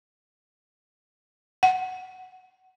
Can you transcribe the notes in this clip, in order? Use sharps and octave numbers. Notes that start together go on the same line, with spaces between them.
F#5